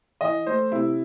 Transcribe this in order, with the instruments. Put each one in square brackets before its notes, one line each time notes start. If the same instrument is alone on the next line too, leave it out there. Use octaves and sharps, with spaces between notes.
[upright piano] E3 D#5
A3 C5
C3 E4